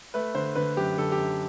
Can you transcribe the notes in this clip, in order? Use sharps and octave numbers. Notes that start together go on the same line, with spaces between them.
A3 B4
D3 C5
D3 B4
F#2 G4
D3 A4
G4
F#2